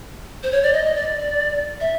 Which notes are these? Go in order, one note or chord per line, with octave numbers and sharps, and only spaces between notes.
C5
C#5
D5
D#5
D#5
D5
E5